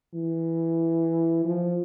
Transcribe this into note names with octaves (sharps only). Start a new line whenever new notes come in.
E3
F3